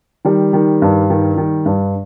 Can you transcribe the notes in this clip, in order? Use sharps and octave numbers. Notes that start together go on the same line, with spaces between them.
D#3 G3
D#3
G2
D#3
D#3
G2